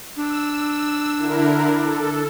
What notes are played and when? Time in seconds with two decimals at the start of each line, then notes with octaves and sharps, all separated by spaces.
0.17 D4 E6
0.69 E6
1.18 D3 E4 A#4
1.79 A4